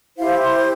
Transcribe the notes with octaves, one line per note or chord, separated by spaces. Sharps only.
E4 G4 C5 F5
C6